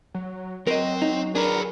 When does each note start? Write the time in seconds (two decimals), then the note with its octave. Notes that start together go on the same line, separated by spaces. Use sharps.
0.14 F#3
0.67 F#3 C4 A#4 D#5
1.02 D#4
1.35 D4 G#4 A#4 B4